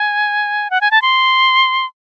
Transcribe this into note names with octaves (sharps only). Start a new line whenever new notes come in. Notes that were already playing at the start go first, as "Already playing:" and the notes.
Already playing: G#5
F#5
G#5
A5
C6